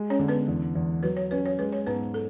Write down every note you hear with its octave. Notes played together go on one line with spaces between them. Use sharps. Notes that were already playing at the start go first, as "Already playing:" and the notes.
Already playing: G#3
C#4 C#5
D3
B3 B4
E2
E2
F#3 B4
C#5
C#4 B4
C#5
G#3 B4
C#5
G#2 B3 B4
A4